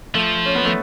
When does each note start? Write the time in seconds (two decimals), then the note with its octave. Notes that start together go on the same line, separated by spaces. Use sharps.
0.14 F3 A3
0.46 C#4
0.55 B3
0.65 A3